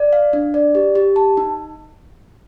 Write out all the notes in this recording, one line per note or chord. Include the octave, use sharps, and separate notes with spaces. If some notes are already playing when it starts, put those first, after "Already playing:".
Already playing: D5
F5
D4
D5
G4
G4
A5
D#4